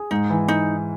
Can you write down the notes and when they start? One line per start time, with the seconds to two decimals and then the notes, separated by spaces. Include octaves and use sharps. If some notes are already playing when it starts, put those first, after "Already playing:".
Already playing: G#4
0.11 G#2 D#4
0.30 E3
0.48 D#4